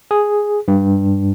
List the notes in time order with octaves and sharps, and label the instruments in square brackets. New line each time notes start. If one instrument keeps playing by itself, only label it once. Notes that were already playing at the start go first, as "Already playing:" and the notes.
[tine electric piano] G#4
G2